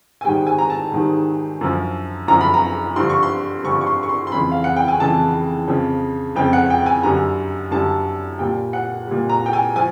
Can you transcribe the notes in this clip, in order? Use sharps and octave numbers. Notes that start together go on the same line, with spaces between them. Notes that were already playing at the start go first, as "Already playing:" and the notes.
G#5
G#2 D#3 G3 G5
G#5
A#5
A5
G#2 D#3 G3
F#2 D3 F3
F#2 D3 F3 A#5
B5
A#5
G2 D3 F3 C6
C#6
C6
G2 D3 F3 C#6
C#6
C6
C#6
C6
C6
F2 C#3 E3 B5
F5
F#5
G5
G#5
F2 C#3 E3 A5
F2 C#3 F3
F2 C#3 F3 G5
F#5
G5
G#5
F#2 D3 G3 A#5
F#2 D3 G3 A5
A#2 G3 G5
F#5
A#2 G3
A#5
G5
G#5
F3 G#5